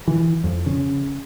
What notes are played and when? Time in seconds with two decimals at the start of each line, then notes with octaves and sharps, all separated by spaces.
0.08 E3
0.44 F2
0.66 C#3